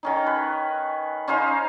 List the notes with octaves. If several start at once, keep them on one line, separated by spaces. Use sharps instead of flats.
D#3 C#4 D#4
B4
C#4 D#4 C5 F5